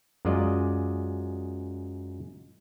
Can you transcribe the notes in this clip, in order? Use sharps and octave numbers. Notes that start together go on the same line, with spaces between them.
F#2 G#3 F4 D5 D#5